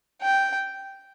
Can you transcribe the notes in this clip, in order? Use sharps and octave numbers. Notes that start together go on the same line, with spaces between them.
G5